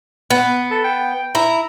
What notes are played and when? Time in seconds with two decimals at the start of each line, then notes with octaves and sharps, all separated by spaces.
0.30 B3
0.71 A4
0.84 G5
1.35 E4 A#5